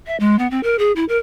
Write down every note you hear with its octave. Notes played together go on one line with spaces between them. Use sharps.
E5
G#3
B3
C4
A#4
G#4
E4
A#4